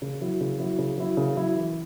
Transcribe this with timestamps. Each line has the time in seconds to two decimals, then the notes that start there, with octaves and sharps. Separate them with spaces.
0.02 C#3
0.21 F#3 E4
0.41 C#3
0.60 F#3 E4
0.79 C#3
0.98 F#3 E4
1.17 C#3
1.36 F#3 E4
1.55 E3